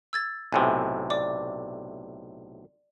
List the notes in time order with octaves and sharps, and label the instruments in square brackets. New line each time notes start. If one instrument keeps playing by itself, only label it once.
[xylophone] E6 G#6 A6
[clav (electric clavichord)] B1 A2 C3 [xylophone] G#5
[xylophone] D5 D6